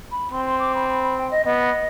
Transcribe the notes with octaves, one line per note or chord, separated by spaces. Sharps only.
B5
C4 C6
C6
D6
B5
B5
B5
G5
D#5
B3 D#5